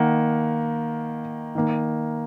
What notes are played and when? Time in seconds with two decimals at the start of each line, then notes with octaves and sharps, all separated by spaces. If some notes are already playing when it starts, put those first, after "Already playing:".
Already playing: D#3 A#3 F#5
1.55 D#3 A#3